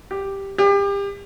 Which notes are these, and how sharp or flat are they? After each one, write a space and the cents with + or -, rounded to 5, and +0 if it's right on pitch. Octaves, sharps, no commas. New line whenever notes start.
G4 +0
G4 +30